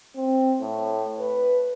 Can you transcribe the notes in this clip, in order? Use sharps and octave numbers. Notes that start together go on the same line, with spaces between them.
C4
A2
B4